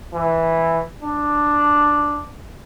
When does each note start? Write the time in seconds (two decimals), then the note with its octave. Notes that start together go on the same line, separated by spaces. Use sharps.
0.13 E3
1.02 D4